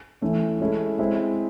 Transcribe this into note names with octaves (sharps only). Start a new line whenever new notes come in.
E3 A3 C#4
G#3 C#4 E4 A4
G#3 C4 E4